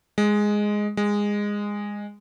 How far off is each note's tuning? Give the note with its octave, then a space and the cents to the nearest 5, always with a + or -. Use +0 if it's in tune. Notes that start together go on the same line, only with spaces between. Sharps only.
G#3 +0
G#3 -15